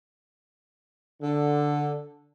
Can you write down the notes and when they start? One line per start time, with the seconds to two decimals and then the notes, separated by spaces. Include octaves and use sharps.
1.22 D3